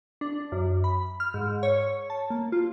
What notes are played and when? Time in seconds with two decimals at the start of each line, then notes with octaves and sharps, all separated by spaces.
0.21 D4
0.52 F#2
0.84 B5
1.20 F6
1.34 G#2
1.63 C#5
2.10 A5
2.30 A#3
2.52 F4